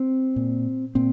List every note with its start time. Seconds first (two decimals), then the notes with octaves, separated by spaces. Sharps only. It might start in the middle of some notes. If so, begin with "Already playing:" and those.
Already playing: C4
0.36 A#2
0.95 A#2 C4